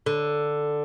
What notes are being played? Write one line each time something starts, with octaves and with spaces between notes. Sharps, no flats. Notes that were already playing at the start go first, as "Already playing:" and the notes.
D3